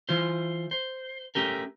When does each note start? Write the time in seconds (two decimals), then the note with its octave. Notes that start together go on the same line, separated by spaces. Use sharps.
0.09 E3 F4 C5
0.71 C5
1.35 A3 C#4 G4 A#4